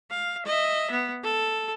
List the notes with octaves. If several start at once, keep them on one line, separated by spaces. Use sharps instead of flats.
F5
D#5 E5
B3
A4